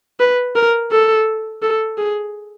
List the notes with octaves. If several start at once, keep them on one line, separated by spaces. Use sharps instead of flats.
B4
A#4
A4
A4
G#4